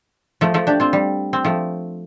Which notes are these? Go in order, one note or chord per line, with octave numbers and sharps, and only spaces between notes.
F3 A3
F3 A3
D4 G4
C4 F4
G3
C4
F3 A3